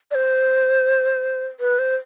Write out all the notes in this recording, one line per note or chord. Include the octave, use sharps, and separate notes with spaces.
D5
C5
B4
C5